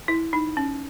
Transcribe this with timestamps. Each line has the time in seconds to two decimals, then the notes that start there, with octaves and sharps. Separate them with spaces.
0.08 E4
0.33 D#4
0.57 C#4